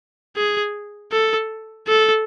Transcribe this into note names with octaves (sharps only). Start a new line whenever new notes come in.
G#4
A4
A4